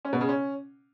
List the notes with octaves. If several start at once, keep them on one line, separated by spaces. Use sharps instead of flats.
C#4
B2
C#3
C#4